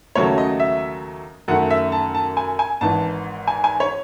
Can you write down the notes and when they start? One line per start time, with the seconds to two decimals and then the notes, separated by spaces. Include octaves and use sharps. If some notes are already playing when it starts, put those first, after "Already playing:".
0.15 D#2 C#3 F#3 A3 C#5
0.38 D#5
0.60 E5
1.48 F#2 D#3 A3 F#5
1.70 E5
1.92 A5
2.15 A5
2.37 G#5
2.59 G#5
2.81 G#1 G#2 E3 A5
3.47 G#5
3.64 G#5
3.80 C#5